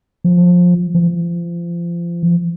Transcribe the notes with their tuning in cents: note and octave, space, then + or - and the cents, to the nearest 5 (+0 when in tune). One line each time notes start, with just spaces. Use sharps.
F3 +20
F3 -30